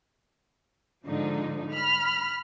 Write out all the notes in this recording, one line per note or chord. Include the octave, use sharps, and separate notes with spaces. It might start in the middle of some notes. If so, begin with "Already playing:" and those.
G#2 D3 F3 D#4
B5 F6